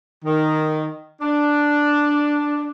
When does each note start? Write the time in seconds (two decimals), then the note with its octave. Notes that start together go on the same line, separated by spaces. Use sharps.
0.25 D#3
1.21 D4